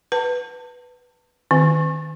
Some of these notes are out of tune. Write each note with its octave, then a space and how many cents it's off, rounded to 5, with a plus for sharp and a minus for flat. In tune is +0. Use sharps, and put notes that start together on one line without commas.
B4 +0 A5 +35
D#3 -5 C4 +0